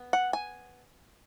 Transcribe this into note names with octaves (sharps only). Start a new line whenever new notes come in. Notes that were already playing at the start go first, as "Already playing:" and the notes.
Already playing: B3
F#5
G#5